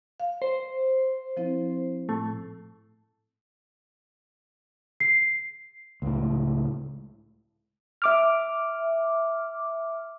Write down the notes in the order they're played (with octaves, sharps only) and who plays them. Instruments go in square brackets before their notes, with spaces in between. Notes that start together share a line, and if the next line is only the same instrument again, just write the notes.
[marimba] F5
[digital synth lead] C5
[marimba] F3 C4 E4
[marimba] A2 [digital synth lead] A3
[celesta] C7
[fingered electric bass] C#2 A2
[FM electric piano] E5 D6 F6